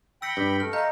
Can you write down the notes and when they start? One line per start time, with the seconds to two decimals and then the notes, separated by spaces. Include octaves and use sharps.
0.22 G5 B5 E6 A#6 C#7
0.37 G2
0.60 A3 F6
0.73 D#5 F5 A#5 G6